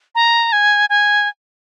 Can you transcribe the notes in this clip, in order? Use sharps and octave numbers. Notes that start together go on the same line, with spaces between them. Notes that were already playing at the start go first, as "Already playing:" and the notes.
A#5
G#5
G#5